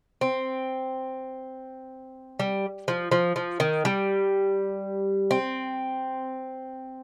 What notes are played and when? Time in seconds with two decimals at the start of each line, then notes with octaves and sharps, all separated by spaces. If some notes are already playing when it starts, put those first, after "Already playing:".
0.21 C4
2.39 G3
2.88 F3
3.12 F3
3.36 F3
3.60 D#3
3.85 G3
5.31 C4